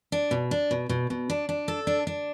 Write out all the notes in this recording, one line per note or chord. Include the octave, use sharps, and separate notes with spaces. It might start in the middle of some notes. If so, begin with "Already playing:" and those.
D4
B2
D4
B2
B2
B2
D4
D4
A4
D4
D4